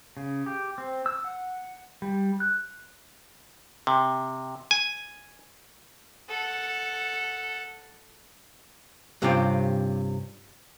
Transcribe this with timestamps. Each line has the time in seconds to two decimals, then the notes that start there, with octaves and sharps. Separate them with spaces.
0.17 C#3
0.46 G4
0.78 C4
1.06 E6
1.24 F#5
2.02 G3
2.40 F#6
3.87 C3
4.71 G#5
6.29 A4 F#5
9.22 G2 C3 C4 C#4 F4 G4